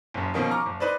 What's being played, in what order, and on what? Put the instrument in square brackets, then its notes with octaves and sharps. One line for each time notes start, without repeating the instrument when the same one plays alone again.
[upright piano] F#1 F#2
B2 D#3 F3 A#3 C#4 D#4
A#5 C#6 D6 F6
F#1
D#4 B4 C5 D5